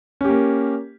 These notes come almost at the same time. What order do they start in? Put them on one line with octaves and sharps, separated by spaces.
C#4 G4 A#3